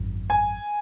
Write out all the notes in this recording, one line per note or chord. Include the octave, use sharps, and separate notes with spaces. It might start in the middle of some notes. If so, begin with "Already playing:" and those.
Already playing: G#1 F#2 F#3
G#5